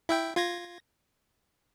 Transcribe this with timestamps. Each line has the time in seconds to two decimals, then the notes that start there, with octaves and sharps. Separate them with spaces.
0.09 E4 E5 G5
0.36 F4 G#6 A#6